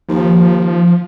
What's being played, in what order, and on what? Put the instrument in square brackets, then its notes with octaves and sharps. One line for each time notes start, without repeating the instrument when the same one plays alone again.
[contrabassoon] D#2 [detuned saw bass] F3